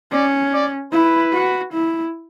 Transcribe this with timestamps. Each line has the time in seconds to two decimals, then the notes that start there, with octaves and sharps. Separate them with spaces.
0.12 C#4 D5
0.53 D5
0.92 E4 B4
1.33 F#4
1.73 E4